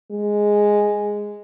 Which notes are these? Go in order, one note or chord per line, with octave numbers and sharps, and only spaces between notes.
G#3